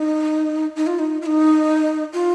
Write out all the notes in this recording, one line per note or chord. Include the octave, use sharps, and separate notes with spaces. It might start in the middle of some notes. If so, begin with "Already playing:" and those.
Already playing: D#4
D#4
F4
D#4
F4
D#4
F4